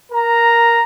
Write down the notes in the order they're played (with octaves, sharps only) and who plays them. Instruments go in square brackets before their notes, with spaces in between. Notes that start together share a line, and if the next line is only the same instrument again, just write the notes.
[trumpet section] A#4 A#5